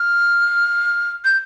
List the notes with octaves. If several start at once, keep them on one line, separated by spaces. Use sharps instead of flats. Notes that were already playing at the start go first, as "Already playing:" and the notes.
Already playing: F6
G6